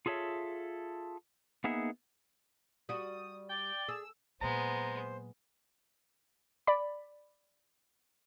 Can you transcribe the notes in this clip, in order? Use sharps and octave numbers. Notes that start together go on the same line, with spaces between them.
F4 G#4 A4 C#5 E5
A#3 B3 D#4 G#4 E5 F#5
G3 F#4 D#6
D5 G5 G7
G#4 E6
A#2 F#3 G#3 B3 C5 A#5
D5 B5